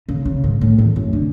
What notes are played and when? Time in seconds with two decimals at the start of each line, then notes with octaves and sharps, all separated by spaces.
0.09 C#3
0.25 C#3
0.44 G#2
0.61 A2
0.78 E2
0.96 F#2
1.13 D3